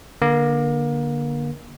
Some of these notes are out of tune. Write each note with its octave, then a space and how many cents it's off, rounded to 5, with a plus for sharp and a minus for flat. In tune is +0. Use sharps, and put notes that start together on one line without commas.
D3 +5 A#3 +30